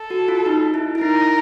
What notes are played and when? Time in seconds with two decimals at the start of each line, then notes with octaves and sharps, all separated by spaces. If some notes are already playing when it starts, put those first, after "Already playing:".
Already playing: A4
0.10 F#4
0.28 F4
0.46 D#4
0.74 E4
0.95 E4
1.01 D#4 A#4